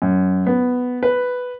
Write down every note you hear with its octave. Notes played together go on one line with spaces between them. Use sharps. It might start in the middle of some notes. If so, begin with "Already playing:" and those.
F#2
B3
B4